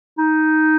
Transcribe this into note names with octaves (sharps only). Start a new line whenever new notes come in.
D#4